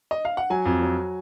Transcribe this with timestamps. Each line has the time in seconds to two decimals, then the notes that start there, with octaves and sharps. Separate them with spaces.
0.11 D#5
0.25 F5
0.37 F#5
0.50 F#3 G#5
0.66 F2
0.82 F#3